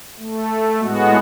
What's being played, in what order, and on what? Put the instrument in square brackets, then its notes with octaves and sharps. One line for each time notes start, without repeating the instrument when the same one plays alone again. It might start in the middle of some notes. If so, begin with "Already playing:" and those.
[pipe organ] A3
A2 G#3 B3 F#4